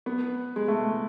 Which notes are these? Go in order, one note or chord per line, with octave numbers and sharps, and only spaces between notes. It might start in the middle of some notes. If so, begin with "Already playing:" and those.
B3
G#3
A3